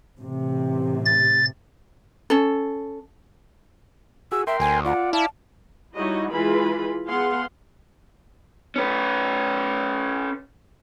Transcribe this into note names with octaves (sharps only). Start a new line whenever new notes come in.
A1 C3
A6
C#4 A4
F#4 G#4 E6
A#4 E5 G5 C6
D2 G#5
F4 D5 F#5
E4 D5 F5 A5
G3 D#4 E4 F#4 C#5 D#5
E3 G#3 E4 F4 B4 B5
B3 G#4 F5 F#5 C6
C#4 B4